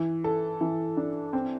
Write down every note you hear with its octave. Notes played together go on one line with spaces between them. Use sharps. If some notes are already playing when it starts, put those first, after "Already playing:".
Already playing: E3
A4
E3
D4
C4